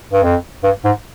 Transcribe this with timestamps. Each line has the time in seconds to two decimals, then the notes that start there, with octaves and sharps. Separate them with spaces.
0.13 G2
0.23 F2
0.63 G2
0.85 G#2